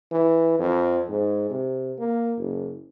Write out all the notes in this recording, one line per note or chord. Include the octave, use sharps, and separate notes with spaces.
E3
F2
G#2
C3
A#3
F#1